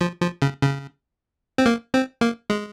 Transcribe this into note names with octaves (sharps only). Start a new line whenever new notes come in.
F3
F3
C#3
C#3
C4
A#3
C4
A#3
G#3